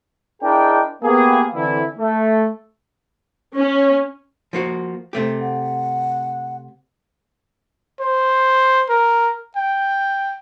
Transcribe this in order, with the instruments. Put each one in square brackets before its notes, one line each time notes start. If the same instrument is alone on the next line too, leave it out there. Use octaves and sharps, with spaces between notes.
[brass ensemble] D4 E4 G#4 A#4 D#5 G5
A#3 B3 G4 G#4
D3 E3 C4 E4
A3
[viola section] C#4
[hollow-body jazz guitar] F3 A#3 F#4
C3 A3 G4
[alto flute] F#5
[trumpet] C5
A#4
G5